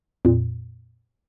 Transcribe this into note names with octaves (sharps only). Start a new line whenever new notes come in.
F2 A#2